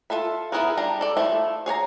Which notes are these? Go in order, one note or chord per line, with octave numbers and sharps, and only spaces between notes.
F4 A4 E5 B5
B3 E4 G#4 A#4 B4
G3 D4 A#5
A4 D5
F3 A3 E4
G#4 C#5 G#5 A#5